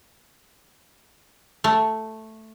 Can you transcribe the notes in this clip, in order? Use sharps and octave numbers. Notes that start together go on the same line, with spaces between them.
A3